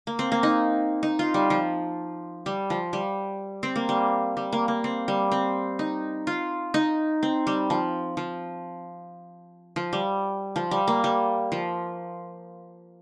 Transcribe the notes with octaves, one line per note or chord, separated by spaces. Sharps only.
A#3
C4
A#3
D#4
D#4
F4
G3
F3
G3
F3
G3
C4
A#3
G3
G3
A#3
A#3
C4
G3
C4
D#4
F4
D#4
C4
G3
F3
F3
F3
G3
F3
G3
A#3
G3
F3